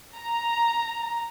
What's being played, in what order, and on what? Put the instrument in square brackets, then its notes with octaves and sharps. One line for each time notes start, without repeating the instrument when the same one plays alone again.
[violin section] A#5